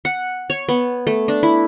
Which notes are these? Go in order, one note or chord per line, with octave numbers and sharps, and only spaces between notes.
F#5
C#5
B3
A3
D4
E4